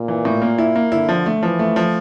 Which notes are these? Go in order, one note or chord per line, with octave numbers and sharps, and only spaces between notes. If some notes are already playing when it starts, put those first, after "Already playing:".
Already playing: A#2
E3
A2
A#3
E4
A#3
D3 E4
F3
A3
E3 F3
A3
F3